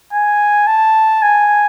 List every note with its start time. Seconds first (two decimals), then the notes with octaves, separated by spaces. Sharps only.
0.13 G#5
0.67 A5
1.22 G#5